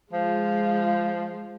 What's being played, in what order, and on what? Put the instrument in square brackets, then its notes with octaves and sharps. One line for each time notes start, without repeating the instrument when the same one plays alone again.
[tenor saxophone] F3 [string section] G#3 F4